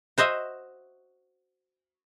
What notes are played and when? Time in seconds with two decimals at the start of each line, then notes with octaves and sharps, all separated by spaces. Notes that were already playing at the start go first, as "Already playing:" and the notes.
0.18 F#4 C5 D#5 E5